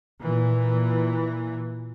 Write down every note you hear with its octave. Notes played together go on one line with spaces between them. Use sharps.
A#2 E3